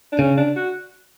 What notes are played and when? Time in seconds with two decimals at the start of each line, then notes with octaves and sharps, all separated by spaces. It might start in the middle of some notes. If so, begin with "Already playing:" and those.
0.12 D4
0.19 C#3 C#4
0.38 D4
0.56 F#4